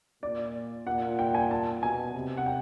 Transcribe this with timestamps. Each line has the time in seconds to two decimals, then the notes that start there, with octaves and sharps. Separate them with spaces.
0.23 A#2 D5
0.86 A#2 F#5
1.19 G5
1.35 G#5
1.51 A5
1.82 B2 G#5
2.14 C3
2.37 F#5
2.46 G5